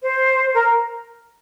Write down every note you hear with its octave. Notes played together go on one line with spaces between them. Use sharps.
C5
A#4